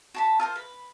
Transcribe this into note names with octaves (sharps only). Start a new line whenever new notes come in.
F#4 A5 B5
F4 A#4 C5
B4